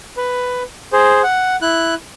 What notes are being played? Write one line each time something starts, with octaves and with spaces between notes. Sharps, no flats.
B4
G#4 C5
F#5
E4 F#6